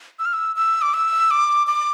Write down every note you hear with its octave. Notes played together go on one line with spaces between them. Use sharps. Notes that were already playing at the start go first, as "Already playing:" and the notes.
E6
F6
E6
E6
D6
E6
D6
D6